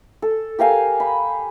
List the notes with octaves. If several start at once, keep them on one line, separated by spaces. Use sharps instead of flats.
A4
G4 A#4 F5 G#5
B5